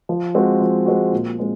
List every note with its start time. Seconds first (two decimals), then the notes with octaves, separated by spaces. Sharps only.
0.09 F3
0.34 G#3 C4 F#4
0.61 F3
0.86 G#3 C4 F#4
1.12 A#2
1.38 G#3 C4